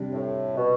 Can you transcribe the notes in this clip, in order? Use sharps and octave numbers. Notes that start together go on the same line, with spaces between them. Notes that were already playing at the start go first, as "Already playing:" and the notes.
Already playing: C3 G3 D4
A2
B2